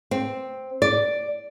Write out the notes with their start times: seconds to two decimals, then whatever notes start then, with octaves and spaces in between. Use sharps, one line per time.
0.11 C4
0.82 D5